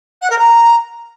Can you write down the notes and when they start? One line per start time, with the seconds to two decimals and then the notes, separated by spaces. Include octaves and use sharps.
0.21 F#5
0.30 A#4
0.38 A#5